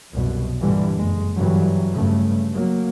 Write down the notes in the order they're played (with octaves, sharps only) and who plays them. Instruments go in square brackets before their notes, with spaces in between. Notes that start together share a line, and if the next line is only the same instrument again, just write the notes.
[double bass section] C2 F#2 B2
G2 A#2 D3 E3 G3
F#1 G#3
G2 D3 E3 F#3 G3
G2 C#3 A3
F#3 A#3